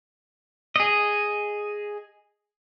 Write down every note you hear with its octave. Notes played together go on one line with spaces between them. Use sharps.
G#4 D#5